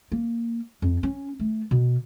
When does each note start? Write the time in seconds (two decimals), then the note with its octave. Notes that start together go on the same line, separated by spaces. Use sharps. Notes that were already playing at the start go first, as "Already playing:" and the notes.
0.12 A#3
0.82 F2
1.03 C#4
1.39 A3
1.71 B2